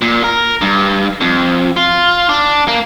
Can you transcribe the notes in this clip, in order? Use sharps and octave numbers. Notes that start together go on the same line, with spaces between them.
A#2
A#4
G2
F2
F4
D4
A#3